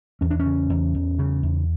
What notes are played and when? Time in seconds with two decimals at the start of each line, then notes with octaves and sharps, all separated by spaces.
0.21 E2 C#4
0.30 D4
0.40 C#4
0.46 C#3
0.70 E2
0.94 E2
1.19 C#3
1.43 E2